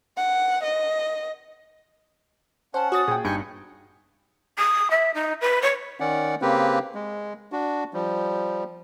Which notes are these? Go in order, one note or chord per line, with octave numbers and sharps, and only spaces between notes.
F#5
D#5
C#4 C5 F#5 A5
F#4 C#5 D#6 A6
A#2 G#4 G5
G1 G2 D#4 G5 G#5 C#7
D#6
E5
D#4
B4
C#5
D#3 C#4 D5 F#5
C#3 A#3 C4 G4 B4
G#3
D4 F#4
F3 G3